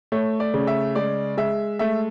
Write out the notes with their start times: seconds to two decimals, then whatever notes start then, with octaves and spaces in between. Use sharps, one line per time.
0.12 A3 C#5
0.40 D5
0.54 C#3
0.67 E5
0.95 G#3 D5
1.37 G#3 E5
1.79 A3 E5